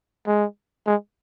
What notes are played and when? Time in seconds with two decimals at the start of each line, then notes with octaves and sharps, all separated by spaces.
0.27 G#3
0.87 G#3